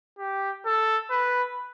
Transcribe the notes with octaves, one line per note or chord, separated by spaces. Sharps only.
G4
A4
B4